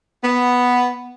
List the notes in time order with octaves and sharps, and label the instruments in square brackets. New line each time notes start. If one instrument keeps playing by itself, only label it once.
[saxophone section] B3